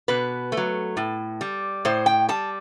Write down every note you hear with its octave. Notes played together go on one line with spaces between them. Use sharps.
B2 B4
A3
F#3
A2
G3
A2 C5
G5
G3 A5